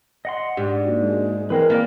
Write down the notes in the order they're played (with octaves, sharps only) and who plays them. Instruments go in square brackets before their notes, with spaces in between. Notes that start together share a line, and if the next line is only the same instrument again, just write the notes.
[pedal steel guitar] D#5 F#5 C6
[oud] G#2 [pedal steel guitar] D4 [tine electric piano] G4
[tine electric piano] A#3 D#4 F#4
[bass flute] G#3
[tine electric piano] E3 [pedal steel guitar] G#3 C4 B4 [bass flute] A#4
[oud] A#3 D5 [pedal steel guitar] B4